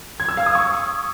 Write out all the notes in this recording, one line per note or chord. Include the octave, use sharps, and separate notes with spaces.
G#6
E6
F5
D#6
C#6